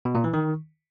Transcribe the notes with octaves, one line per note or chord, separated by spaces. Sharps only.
B2
A#2
E3
D#3